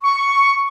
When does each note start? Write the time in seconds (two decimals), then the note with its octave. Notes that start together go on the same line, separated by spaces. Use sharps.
0.04 C#6